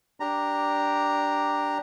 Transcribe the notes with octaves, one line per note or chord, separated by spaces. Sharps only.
D4 G4 A#5